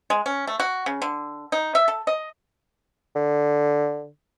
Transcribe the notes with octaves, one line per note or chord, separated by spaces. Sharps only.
G#3
C#4
A3
F#4
C#3
D3
D#4
E5
A4
D#5
D3